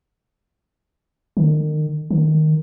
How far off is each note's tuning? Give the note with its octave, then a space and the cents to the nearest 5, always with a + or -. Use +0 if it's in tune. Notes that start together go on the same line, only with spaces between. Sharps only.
D#3 -35
D#3 -5